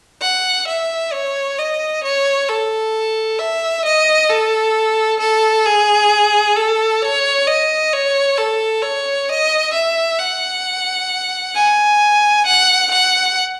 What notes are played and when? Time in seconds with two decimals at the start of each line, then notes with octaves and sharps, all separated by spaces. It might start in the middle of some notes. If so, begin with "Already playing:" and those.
0.22 F#5
0.68 E5
1.12 C#5
1.59 D#5
2.03 C#5
2.48 A4
3.39 E5
3.85 D#5
4.30 A4
5.20 A4
5.66 G#4
6.56 A4
7.02 C#5
7.47 D#5
7.92 C#5
8.38 A4
8.82 C#5
9.29 D#5
9.73 E5
10.19 F#5
11.55 G#5
12.46 F#5
12.91 F#5